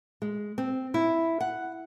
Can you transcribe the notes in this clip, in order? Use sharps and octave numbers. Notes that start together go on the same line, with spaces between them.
G#3
C4
E4
F#5